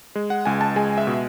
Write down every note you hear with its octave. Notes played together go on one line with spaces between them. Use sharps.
G#3
F#5
C#2 G#5
A5
G#3 G#5
E5
B2